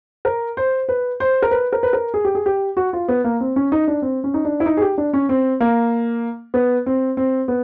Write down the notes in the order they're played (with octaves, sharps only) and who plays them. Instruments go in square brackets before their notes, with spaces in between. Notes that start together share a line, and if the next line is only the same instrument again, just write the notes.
[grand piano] A#4
C5
B4
C5
A#4
B4
A#4
B4
A#4
G#4
G4
G#4
G4
F#4
F4
B3
A#3
C4
C#4
D#4
D4
C4
C#4
D#4
D4
E4
D#4
G#4
G4
D4
C#4
C4
A#3
B3
C4
C4
B3